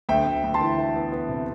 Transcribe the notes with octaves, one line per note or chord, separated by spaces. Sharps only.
D2 E5 G5
D2
D2
A5 C6
E3
E3
B3
B3
C3